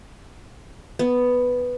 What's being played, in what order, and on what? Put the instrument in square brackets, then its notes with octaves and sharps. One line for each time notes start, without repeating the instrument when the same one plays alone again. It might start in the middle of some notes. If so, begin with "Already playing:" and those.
[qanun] B3